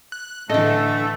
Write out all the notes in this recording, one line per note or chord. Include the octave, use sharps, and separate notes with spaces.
F#6
A2 D3 E3 A3 A4 D#5 E5